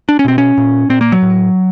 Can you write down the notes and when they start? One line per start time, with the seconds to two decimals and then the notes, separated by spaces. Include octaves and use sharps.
0.09 D4
0.19 C#4
0.25 B2 C4
0.38 C#4
0.57 A#2
0.89 A#2 C4
1.01 A#3
1.12 F#3
1.22 A2